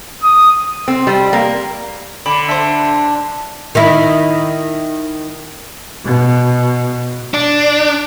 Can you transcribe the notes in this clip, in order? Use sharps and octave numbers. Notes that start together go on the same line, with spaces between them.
D#6
C4
G3
A#3
D3 B5 D6
D4 C5 E5
D#3 E4
B2
D4